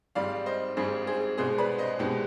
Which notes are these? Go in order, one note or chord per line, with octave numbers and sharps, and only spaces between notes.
G#1 G#2 G3 D5 F5
C5 D#5
G#1 G#2 G3 G#4 C5
G#4 C5
C2 B2 G#3 G#4 C5
B4 D5
C5 D#5
C2 B2 G#3 D#4 G4